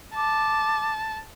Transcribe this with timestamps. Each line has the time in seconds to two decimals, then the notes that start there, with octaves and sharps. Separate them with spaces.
0.16 A5 D6